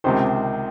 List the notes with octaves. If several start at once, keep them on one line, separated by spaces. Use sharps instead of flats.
C#2 C3 D#3 C5